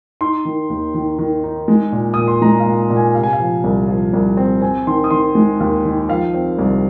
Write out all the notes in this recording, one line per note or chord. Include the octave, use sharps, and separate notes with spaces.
D#4 C6
D#3
D#2
D#3
D#3
D#4
G#3
A#2
A#2 D#6
C6
G#3 A#5
F5
A#2
A#2
G#5
C3 F5
G#5
F5
F3
C2
F3
C2
C4
C4 G#5
D#3 C6
D#6
D#3 C6
G#3
D#2
D#3
F3 F5
C4
C2